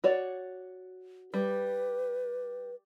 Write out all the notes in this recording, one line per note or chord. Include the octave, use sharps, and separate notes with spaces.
F#4 C#5 D5
G3 B4